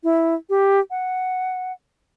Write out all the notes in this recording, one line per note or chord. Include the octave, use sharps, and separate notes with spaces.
E4
G4
F#5